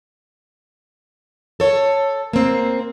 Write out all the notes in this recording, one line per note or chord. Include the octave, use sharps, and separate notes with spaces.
A4 C#5
A#3 C4